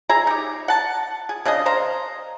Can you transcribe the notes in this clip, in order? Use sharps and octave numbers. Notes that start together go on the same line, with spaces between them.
G#4 E5 A#5
D#4 G4
F#5 A5
G#4
C#3 D4 G#4 D#5
C5 F5 A#5